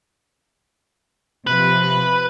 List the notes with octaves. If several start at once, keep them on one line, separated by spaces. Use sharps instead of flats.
C3 F3 B4